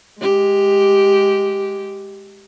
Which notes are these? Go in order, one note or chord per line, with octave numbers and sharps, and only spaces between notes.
G#3 G4